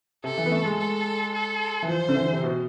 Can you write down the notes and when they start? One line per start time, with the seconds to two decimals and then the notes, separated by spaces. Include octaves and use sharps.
0.24 C3 A4
0.38 E3
0.46 B3
0.52 A3
0.65 G#3
0.78 A4
1.34 A4
1.83 E3
1.88 F3 C5
2.09 D3
2.15 E3
2.33 C3
2.43 B2